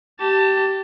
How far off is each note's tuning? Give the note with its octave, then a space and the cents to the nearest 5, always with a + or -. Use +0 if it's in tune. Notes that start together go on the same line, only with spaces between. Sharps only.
G4 -20 A5 +15